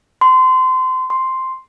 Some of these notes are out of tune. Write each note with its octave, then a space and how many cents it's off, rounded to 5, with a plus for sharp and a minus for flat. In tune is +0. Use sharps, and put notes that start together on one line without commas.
C6 -25
C6 +0